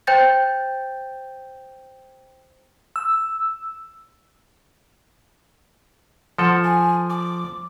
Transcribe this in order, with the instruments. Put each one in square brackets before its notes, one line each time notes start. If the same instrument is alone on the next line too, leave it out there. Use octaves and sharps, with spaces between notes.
[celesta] C5 G5 G6 A6
[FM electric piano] E6
[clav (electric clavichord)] F3 A4 [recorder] F#5
[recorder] G#5
D6